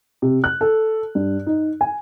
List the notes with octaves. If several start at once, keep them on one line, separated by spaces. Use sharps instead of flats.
C3
F#6
A4
G2
D#4
G#5